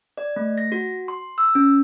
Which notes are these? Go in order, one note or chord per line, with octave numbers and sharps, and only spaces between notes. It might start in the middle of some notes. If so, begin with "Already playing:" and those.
D5
A3
A#6
F#4
C6
E6
C#4